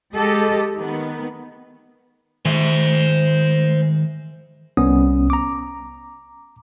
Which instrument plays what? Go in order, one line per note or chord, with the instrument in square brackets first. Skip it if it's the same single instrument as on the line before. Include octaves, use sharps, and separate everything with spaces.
[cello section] G#3 G4 A4 D#5
D#3 B3
[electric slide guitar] D#3 G#3 E5 [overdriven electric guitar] C5 G#5
[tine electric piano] C2 B3 C#4 D#6
A#5 D6